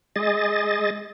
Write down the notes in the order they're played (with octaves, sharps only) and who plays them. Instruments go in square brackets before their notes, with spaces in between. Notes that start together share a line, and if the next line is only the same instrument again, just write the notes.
[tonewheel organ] G#3 G#4 D#5 A6